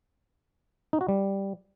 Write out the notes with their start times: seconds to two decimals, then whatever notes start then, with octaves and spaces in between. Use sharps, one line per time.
0.93 D#4
1.01 F#4
1.09 G3